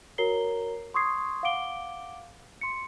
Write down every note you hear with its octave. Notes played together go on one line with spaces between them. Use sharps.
F#4 A#4 C#5 A#5 C7 G7
C6 C#6 D#6 G#6 C7
F5 F#5 D6 D7 G7
C6 C#7